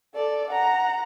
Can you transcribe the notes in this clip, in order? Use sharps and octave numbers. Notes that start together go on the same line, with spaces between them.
A4 D5
F#5 A#5